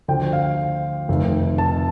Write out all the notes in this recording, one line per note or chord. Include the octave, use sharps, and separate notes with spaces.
D2 D3 F3 G5
F5
F1 F2 D#3 A3
A5